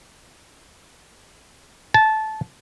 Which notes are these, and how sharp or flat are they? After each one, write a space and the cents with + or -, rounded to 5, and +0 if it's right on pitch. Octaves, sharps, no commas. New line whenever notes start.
A5 -15